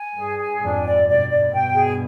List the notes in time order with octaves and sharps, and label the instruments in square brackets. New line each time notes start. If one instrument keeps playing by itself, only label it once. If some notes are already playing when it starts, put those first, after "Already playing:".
Already playing: [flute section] G#5
[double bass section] G2 [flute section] G#4
[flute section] G#5
[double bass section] F2 G#2 [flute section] D4
[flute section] D5
[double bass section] G2 B2 [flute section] D5
[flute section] D5
[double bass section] G2 B2 [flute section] G5
[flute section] G#4